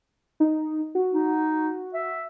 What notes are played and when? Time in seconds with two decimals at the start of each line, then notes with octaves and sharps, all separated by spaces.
0.40 D#4
0.95 F#4
1.12 D#4
1.94 E5